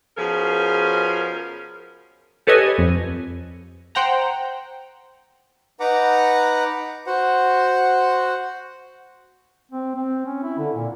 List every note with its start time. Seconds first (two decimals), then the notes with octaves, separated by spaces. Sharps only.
0.17 B2 F3 C#4 G#4 A#4
2.47 G4 A4 B4 C#5 D#5 G#5
2.78 F2
3.95 C5 F#5 G5 A#5
5.80 D#4 B4 F#5 A#5 D6
7.07 F#4 C5 F#5
9.72 C4
9.95 C4
10.26 C#4
10.43 E4
10.58 D3
10.75 A#2